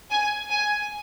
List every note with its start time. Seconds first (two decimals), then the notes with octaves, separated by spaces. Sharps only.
0.11 G#5
0.50 G#5